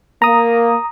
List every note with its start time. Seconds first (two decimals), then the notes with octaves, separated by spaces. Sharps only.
0.22 A#3 A#5 D#6